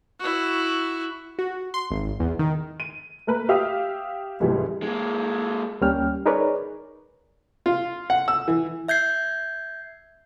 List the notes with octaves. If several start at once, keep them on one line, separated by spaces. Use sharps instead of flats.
E4 F#4
F#4
C6
G#1
E2
D#3
D#7
A3 A#3 A#4 B4
G4 E5 F5 D#6
C2 F2 G#2 E3 G3
G#3 A#3
D2 G3 A#3 C#4 G5 F6
D#4 G#4 A#4 B4 C#5 D5
F4
F#5
E6
E3
E5 G6 G#6 C7